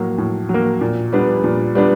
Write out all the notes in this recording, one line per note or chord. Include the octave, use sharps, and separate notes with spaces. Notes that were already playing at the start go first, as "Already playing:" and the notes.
Already playing: A2 F#3 A#3
A2
F#3
A#3
A#2
G3 B3 D4
A#2
G3 B3 D4